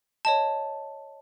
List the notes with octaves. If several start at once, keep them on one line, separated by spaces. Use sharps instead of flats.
C#5 D#5 A5